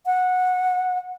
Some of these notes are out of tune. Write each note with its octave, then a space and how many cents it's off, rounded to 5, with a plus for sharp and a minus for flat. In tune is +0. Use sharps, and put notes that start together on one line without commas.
F#5 -15